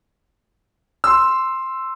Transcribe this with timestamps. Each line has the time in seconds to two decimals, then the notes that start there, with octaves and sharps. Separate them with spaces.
1.04 C6 E6